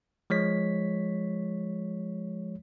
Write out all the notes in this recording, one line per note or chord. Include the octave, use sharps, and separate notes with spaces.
F3 G#3 C#5 B6